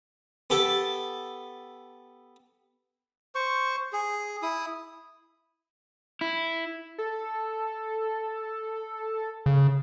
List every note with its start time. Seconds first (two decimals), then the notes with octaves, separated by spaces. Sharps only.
0.50 B3 G4 A4
3.35 C5 C#6
3.93 G#4
4.42 E4 D#6
6.21 E4
6.98 A4
9.46 C#3